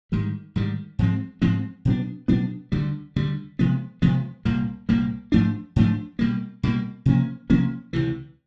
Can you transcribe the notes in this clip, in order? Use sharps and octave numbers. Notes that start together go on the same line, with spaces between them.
G#2 D#3 G3
G#2 D#3 G3
G#2 F3 G#3 C4
G#2 F3 G#3 C4
B2 F#3 B3 D4
B2 F#3 B3 D4
D2 D3 G3
D2 D3 G3
C3 F3 G#3 B3
C3 F3 G#3 B3
C2 A#2 G3 A#3
C2 A#2 G3 A#3
G#2 F3 A3 D4
G#2 F3 A3 D4
B2 G3 A#3
B2 G3 A#3
C3 F3 A#3 C#4
C3 F3 A#3 C#4
C#2 C3 E3